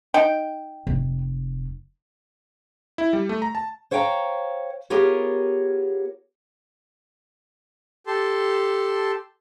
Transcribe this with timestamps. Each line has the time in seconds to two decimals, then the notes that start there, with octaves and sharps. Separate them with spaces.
0.14 D#4 G5
0.87 F1
2.98 E4
3.13 G3
3.29 A3
3.42 A#5
3.55 A5
3.91 C5 C#5 F5 G5 G#5 A#5
4.90 B3 F4 G4 G#4 A#4 C#5
8.07 G4 A4 A5 C6